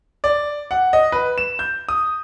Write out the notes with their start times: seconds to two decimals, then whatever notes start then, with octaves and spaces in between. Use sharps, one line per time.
0.24 D5
0.71 F#5
0.93 D#5
1.12 B4
1.38 E7
1.59 G6
1.89 D#6